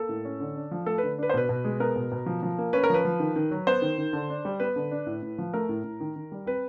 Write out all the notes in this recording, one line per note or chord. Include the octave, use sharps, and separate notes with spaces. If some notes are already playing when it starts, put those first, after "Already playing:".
Already playing: A#3 A4
A2
C#4
D3
D4
F3
A3 A4
B4
D3
D4 B4
C5
B2 B4
B2
G#3
B3 A#4
B2
B2
F3
F3
A#3
C#4 B4
A#4
F3 B4
F3
D#3
D#3
F#3
B3 C5
D#3
D#3
D3
D4
G3
B3 B4
D3
D4
A2
A2
F3
A3 A#4
A2
A2
D#3
D#3
G3
C4 B4